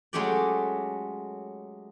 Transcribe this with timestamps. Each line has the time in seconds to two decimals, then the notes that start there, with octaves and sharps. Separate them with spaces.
0.13 F#3 G#3 A3 C#4 G4 D5